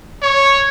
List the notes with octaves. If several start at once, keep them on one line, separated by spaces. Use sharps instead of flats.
C#5